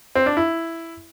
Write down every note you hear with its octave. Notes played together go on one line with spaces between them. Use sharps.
C4
D4
E4